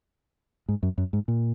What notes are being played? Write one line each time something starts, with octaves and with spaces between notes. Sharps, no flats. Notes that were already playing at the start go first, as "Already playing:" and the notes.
G#2
F#2
F#2
G#2
A#2